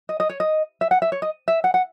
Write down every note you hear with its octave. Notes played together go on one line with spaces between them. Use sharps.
D#5
D#5
C#5
D#5
E5
F#5
E5
C#5
D#5
E5
F#5
F#5